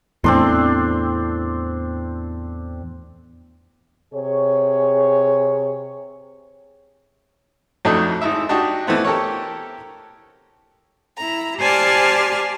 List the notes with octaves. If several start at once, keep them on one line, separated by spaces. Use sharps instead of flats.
E2 A2 C4 D4 C6
C3 G#4 C#5
F2 A2 F#3 A3 D4 D#4
G#1 D#4 E4 E5
D4 D#4 F#4 G4
E3 A3 B3 C4
G4 A4 A#4 C#5
E4 A#5
G4 C5 D5 G#5 A5 F6